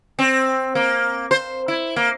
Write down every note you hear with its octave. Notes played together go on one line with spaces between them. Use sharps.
C4
A#3
C5
E4
A#3